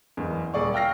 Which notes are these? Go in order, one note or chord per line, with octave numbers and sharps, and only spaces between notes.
F#1 E2
D#1 G#4 D5 C#6
F5 G5 E6 F6 A#6 C7